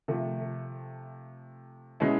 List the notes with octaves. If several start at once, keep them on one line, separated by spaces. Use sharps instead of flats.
C3 F3 A3
B2 G#3 C#4 E4